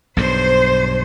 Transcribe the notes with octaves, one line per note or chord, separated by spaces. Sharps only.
B1 G2 C5